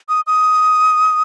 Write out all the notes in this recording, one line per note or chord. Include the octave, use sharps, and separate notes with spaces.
D#6
D#6